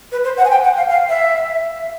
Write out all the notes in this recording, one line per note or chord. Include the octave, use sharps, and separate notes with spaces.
B4
C5
F#5
G#5
G5
F#5
F5
F5
E5